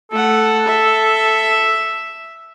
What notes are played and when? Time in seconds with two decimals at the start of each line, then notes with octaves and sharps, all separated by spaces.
0.12 A3 A4 F#5
0.66 E5